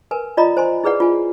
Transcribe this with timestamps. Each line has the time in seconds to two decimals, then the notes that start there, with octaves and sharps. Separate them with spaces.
0.11 A#4 B4 G#5
0.37 F4 D5 D#5 A#5 B5 D#6
0.57 C5 G#5 C6
0.84 E4 G#4 B4 D5 F#5
1.00 F4 G#5